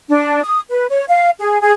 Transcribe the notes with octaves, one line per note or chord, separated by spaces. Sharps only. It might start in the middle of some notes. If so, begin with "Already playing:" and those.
D4
D#6
B4
C#5
F5
G#4
G#4